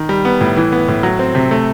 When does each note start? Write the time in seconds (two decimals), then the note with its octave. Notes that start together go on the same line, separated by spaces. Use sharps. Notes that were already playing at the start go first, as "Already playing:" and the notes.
Already playing: D#3
0.09 G3
0.25 B3
0.41 A2
0.57 E3
0.72 B3
0.88 A2
1.03 F#3
1.19 C4
1.35 C3
1.51 A3